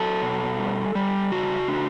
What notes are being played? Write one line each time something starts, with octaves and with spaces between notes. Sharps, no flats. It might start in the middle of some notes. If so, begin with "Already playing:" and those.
Already playing: F#3 A4
B2
G3
G3
C#3 F#4
D4